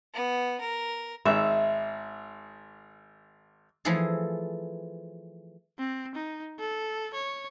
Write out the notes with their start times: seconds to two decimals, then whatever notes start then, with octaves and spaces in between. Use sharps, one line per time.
0.14 B3
0.61 A#4
1.26 G#1 G#2 E5
3.85 E3 F3 A3 E4 G#4 A4
5.79 C4
6.15 D#4
6.60 A4
7.14 C#5